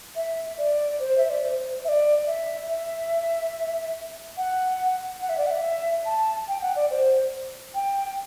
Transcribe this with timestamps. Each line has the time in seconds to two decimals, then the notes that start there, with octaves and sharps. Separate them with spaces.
0.16 E5
0.58 D5
1.00 C5
1.18 E5
1.30 D5
1.42 C5
1.85 E5
1.89 D5
2.27 E5
2.68 E5
4.37 F#5
5.21 F#5
5.29 E5
5.38 D5
5.46 F#5
5.51 E5
6.06 A5
6.48 G5
6.62 F#5
6.76 D5
6.91 C5
7.75 G5